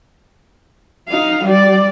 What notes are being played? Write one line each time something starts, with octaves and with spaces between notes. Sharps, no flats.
D#4 F5
G3 D5